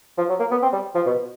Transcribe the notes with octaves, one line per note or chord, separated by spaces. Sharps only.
F3
F#3
A#3
B3
C4
G3
F3
B2